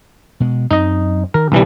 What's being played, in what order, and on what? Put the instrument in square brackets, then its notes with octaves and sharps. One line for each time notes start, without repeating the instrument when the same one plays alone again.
[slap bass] B2 G#3
[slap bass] F#2 C4 [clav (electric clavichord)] D#4 D#5
[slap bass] D#3 [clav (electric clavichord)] A#4
[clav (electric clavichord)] B1 E3 G3 [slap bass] C#3 B3 C4